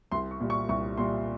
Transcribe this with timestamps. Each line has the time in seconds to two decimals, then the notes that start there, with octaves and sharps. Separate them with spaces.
0.12 C2 C6
0.31 C#6
0.40 A#2 G3
0.50 C#6
0.69 C2 C#6
0.97 A#2 G3 C6